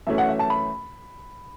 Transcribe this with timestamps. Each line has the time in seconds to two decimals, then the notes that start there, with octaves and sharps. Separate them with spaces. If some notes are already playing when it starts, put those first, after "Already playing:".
0.07 F#2 E3 A3 C#4 E5
0.18 F#5
0.28 E5
0.39 A5
0.50 B5